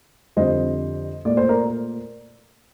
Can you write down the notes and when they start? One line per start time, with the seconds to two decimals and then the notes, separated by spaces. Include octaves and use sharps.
0.37 F2 D3 G3 C5 D#5
1.25 A#2 A3 D5
1.37 C5
1.49 A#4 D5